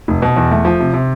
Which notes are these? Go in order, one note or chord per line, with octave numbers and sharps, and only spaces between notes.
F1
B2
E2
A3
F3
C3
C3